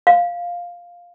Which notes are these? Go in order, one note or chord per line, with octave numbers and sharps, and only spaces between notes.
F5